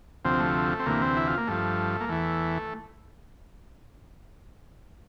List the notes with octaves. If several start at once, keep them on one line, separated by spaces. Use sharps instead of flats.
D2 C3 F3 C4
A3
C4
D2 C3 E3 A#3
C4
E4
F4
A#3
G2 F3 A3
A#3
E2 E3 A3